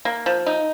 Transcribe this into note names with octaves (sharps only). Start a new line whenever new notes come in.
A#3
F3
D#4